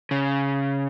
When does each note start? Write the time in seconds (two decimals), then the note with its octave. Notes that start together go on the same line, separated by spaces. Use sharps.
0.11 C#3